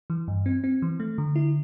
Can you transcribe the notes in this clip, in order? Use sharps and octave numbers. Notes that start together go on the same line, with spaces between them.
E3
G2
C4
C4
E3
A3
D3
E4